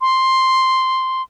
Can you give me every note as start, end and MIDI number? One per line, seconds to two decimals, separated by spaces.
0.01 1.22 84